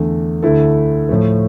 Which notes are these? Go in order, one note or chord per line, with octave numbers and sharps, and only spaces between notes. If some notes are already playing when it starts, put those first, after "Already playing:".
Already playing: E2 D3 A3
D2 D3 A3 E4 A4
A2 F3 A3